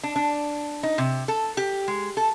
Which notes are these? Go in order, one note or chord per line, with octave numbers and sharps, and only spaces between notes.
D4
D4
D#4
C3
A4
G4
G#3
A4